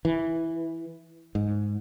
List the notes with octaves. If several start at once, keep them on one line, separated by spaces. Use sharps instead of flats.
E3
G#2